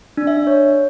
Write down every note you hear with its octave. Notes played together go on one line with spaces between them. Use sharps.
D4
E5
D4
C#5